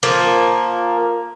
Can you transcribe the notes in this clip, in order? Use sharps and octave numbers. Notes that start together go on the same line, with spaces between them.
F3 A#3